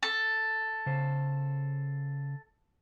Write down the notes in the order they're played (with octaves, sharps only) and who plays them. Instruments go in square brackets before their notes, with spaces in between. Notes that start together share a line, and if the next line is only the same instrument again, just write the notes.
[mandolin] A4
[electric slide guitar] C#3 C5